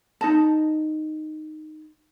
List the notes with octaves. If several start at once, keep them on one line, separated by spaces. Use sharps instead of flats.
D#4 D#5 A5